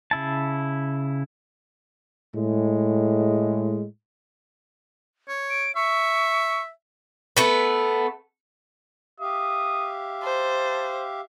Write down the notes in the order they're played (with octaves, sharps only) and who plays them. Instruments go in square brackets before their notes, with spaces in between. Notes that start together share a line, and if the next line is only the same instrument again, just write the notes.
[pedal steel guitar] C#3 E4 A5
[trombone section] A2 G#3
[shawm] C#5
[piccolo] D7
[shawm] E5 [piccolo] C#6
[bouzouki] A3 B3 B4
[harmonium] G4 E5 F5 [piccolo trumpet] D#6
[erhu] C5 [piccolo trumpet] A5